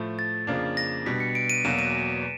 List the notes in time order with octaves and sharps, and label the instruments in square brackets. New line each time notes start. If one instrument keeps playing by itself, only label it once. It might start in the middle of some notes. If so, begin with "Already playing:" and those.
Already playing: [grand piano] A2 F3 A3
[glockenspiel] A6
[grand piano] F2 C#3 F3 A#3 D4
[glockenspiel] A#6
[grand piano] B2 G3 B3 D4 [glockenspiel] B6
[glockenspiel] C#7
D7
D#7
[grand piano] E2 B2 F#3 A#3 [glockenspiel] E7
[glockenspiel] D#7